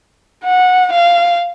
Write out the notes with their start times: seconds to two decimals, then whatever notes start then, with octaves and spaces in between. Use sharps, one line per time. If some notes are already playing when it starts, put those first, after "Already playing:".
0.44 F#5
0.92 F5